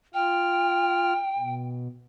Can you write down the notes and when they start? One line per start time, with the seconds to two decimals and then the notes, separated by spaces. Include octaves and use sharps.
0.14 F4 G5 F6
1.38 B2